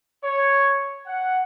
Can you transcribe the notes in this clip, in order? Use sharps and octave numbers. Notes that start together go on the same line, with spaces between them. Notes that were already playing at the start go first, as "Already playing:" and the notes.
C#5
F#5